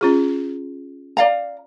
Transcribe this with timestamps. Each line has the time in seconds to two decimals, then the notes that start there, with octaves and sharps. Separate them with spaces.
0.01 C#4 F4 G#4
1.17 D5 F5 A#5